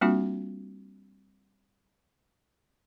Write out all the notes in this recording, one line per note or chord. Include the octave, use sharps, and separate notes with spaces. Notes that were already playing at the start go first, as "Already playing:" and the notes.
G3 A#3 C4 D4 F4 F#4